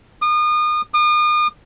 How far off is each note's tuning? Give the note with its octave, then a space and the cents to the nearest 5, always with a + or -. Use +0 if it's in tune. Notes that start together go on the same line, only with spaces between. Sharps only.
D#6 -35
D#6 -40